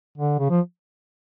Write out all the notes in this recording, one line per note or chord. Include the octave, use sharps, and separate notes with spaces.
D3
C#3
F3